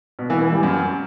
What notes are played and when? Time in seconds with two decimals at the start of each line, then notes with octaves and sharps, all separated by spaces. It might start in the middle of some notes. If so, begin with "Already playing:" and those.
0.19 B2
0.30 E3
0.41 E3
0.52 G3
0.63 F#2